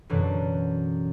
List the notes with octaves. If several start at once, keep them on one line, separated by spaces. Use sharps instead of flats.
F#2 B2 D3 E3